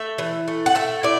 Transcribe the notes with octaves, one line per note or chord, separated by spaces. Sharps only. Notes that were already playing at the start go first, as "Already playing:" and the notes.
Already playing: A3 E5
E3
A3
F#5
A3 E5
E4 D5